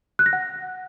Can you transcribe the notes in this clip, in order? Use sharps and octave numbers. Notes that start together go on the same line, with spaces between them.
F#6
A#6
F#5